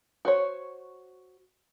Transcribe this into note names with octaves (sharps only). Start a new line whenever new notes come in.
F#4 C5 C#5